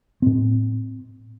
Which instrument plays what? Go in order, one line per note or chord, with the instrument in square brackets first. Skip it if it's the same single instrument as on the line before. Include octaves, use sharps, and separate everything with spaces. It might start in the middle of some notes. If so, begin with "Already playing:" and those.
[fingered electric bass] A2 C4